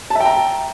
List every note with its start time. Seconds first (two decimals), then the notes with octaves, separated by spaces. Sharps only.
0.10 A5
0.15 E5
0.20 G5
0.25 A#5